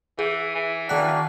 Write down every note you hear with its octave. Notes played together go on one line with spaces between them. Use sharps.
E3 G#4
E3
D#3 A#3 D4 F#4 G5 F#6